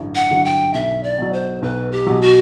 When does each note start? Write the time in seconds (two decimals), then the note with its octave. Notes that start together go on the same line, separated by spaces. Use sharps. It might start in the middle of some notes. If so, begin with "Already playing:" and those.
Already playing: A1 G2 D3 F#3
0.15 F#5
0.30 G2 D3 F#3
0.45 G5
0.74 B1 E5
1.03 D5
1.18 B2 F#3
1.33 C5
1.62 B1 B4
1.92 G4
2.07 B2 F#3
2.22 F#4